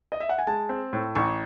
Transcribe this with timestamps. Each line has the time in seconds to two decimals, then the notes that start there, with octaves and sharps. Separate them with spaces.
0.12 D#5
0.20 E5
0.29 F#5
0.38 G#5
0.47 G#3 A5
0.69 C4
0.93 A2
1.15 A1 C#6